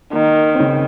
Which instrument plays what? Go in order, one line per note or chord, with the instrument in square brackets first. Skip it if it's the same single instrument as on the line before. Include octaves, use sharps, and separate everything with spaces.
[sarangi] D#3 [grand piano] A#3
[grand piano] C4
C#3 C#4